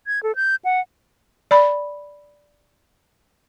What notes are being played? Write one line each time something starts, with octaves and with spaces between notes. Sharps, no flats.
G#6
A4
G6
F#5
D5 B5